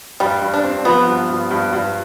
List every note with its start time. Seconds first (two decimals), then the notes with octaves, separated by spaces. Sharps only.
0.20 G2 G3
0.41 G2
0.54 D4
0.64 C4
0.85 F3 B3
1.08 G2
1.29 G2
1.51 G2
1.73 G2